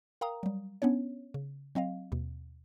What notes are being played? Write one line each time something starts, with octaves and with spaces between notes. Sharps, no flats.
A#4 F5 G5 A#5 D#6
F#3 G3
B3 C#4 D4 C#5
C#3
F#3 C4 D#5 F5
D#2 B2